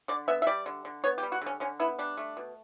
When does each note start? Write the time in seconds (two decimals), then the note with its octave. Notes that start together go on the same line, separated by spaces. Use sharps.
0.08 D3 D5
0.28 B3 E5
0.42 E5
0.47 G3 D5
0.66 D3
0.85 D3
1.04 B3 C#5
1.18 G4
1.23 G3
1.32 F#4
1.42 D3 C#4
1.60 D3 C#4
1.80 B3 E4
1.99 G3 D4
2.17 A3
2.37 B2